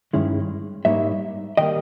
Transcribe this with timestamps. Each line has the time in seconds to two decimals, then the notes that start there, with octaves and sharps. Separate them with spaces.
0.13 G2 D#3 G#3 C#4 E4
0.85 G#2 G3 A#3 D#4 C#5 E5
1.57 D#3 G3 A#3 D#5 G5